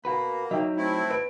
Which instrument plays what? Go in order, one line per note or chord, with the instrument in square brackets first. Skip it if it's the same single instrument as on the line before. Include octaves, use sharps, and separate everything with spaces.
[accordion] A#3 [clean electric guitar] F#4 B4
[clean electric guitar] F#3 [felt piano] D#4 E5 G5
[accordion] A3 C4 E4
[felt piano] B4 D7